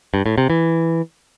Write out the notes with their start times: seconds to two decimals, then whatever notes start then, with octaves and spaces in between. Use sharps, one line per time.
0.14 G2
0.26 A2
0.38 C3
0.50 E3